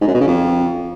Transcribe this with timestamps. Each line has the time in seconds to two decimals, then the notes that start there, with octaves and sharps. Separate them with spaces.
0.01 G#2
0.08 F#2
0.14 B2
0.21 C#3
0.27 F2